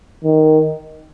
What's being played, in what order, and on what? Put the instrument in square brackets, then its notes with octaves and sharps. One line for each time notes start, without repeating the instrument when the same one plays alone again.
[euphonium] D#3